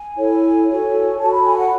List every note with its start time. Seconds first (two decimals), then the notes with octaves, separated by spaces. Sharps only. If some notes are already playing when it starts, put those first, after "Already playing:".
Already playing: G#5
0.17 E4 A4 C#5
0.68 F#4 A4 C#5
1.19 F#4 A4 C#5 A5
1.32 B5
1.45 G#5
1.57 F#5